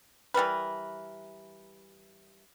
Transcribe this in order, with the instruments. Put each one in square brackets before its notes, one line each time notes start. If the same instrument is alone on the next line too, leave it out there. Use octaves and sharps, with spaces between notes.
[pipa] E3 G3 A#4 B4